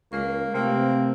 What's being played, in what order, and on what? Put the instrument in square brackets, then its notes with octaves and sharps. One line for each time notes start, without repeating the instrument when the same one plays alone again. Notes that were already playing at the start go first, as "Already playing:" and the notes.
[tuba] C#2 [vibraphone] G#3 A#4 C#6 [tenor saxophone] A#3
[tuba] C3 [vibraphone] A3 B4 [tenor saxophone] A#3 [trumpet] C4